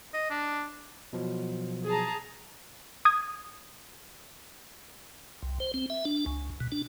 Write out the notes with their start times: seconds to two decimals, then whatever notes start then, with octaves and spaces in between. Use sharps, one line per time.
0.14 D#5
0.30 D4
1.13 B2 F3 F#3
1.87 G#4 A5 A#5
3.05 D#6 G#6
5.42 C2
5.60 C5
5.74 C4
5.90 E5
6.05 D4
6.26 C#2
6.60 B2
6.72 D4